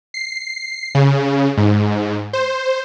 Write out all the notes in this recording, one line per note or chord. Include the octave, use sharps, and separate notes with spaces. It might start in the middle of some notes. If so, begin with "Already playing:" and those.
C7
C#3
G#2
C5